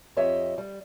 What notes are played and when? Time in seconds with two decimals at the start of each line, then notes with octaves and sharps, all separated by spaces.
0.17 F2 G4 C#5 D#5 E5
0.58 G3